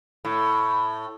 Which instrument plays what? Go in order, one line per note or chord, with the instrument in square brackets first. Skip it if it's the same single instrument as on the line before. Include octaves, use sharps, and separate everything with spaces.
[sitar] A2